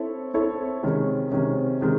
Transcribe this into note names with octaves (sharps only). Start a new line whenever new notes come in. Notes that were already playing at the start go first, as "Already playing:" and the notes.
Already playing: C4 E4 A4 C#5
C4 E4 A4 C#5
C3 D#3 G#3 C#4
C3 D#3 G#3 C#4
C3 D#3 G#3